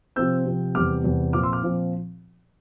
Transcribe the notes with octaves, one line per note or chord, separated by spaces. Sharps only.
C3 F3 C4 E6 G6
C3 F3 C4
E2 C3 G3 D6 F6
E2 C3 G3
A#2 F3 C4 F4 D6 F6
C6 E6
D6 F6
A#2 F3 C4 F4